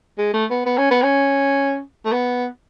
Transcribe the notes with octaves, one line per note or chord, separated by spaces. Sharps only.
G#3
A3
B3
B3
C#4
B3
C#4
A3
B3